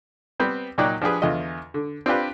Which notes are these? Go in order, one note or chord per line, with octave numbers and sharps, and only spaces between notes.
G3 B3 C4 C5
A#2 F#3 D#4 D5 G5 F#6
F3 D4 G4 G#4 B4
E2 D3 F4 D#5
D3
C4 D4 F4 G4 B4